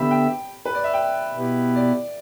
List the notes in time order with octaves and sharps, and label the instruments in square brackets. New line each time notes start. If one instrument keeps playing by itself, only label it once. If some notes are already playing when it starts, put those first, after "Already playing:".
Already playing: [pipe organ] D3 B3 G4 E5 [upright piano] B5
[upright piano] G5
B4
D5
E5
G5
[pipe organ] B2 B3 E4 G4 B4
[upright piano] D5